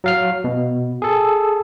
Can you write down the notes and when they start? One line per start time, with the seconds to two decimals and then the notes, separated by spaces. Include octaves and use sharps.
0.04 F#3 F5 F6
0.44 B2
1.02 G#4 A4